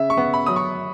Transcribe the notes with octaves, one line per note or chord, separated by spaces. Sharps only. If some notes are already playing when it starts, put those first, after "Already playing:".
Already playing: C#3 E5
C#6
B3
B5
F#3 D#6
C#6